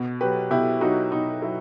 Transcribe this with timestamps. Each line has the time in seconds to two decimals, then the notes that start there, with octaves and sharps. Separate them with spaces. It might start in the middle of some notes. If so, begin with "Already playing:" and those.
Already playing: B2
0.21 F#3 G4 B4
0.51 B2 E4 G4
0.81 F#3 D#4 F#4
1.12 B2 D#4
1.42 F#3 E4